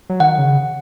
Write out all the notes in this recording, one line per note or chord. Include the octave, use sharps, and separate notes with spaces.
F#3
D#3 F#5
C#3